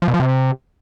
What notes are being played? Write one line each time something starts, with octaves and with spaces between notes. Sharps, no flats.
F3
B2
F3
C3